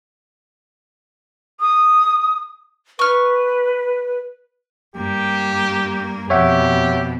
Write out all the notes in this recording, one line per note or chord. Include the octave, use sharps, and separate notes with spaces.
D#6
B4 C#6 F6
G2 A#3 G4
F2 B2 G4 C#5 E5 F#5